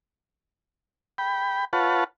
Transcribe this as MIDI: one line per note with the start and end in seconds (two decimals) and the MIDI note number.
1.18 1.65 79
1.18 1.65 83
1.73 2.04 65
1.73 2.04 71
1.73 2.04 73
1.73 2.04 78
1.73 2.04 81